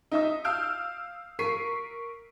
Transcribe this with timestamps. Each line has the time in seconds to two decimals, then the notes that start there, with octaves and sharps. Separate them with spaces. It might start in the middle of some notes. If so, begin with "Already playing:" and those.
0.11 D#4 E5 D#6
0.44 F5 E6 F6 G6 D7
1.39 A#4 C#6 B6 C7 D#7